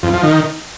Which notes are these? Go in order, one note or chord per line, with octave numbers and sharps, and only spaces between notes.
F2
F3
D#3